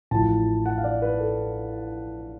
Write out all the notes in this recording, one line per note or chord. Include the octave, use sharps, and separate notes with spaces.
A1 A2 F3 A5
F#5
F5
D5
B4
A4